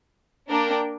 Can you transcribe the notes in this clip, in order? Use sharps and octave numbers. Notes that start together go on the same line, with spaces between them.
A#3 D4 A#4 G5